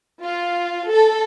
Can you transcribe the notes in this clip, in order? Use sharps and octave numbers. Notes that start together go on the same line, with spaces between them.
F4
A4